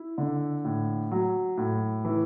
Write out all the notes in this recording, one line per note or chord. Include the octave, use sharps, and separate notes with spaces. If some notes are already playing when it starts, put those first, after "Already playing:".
Already playing: E4
D3
A2
F#3
A2
E3